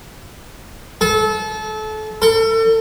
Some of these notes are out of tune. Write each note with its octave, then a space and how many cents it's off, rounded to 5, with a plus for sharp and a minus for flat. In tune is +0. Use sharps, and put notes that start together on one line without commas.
A4 -30
A4 +35